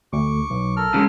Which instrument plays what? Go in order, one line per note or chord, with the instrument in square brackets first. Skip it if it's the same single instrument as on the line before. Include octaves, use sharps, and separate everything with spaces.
[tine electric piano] D2 [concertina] C#6 D6
[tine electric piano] B1
[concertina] A4 A#4 F6
[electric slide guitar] C#3 F#3 G#3